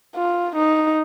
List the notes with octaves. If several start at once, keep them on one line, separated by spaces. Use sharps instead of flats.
F4
D#4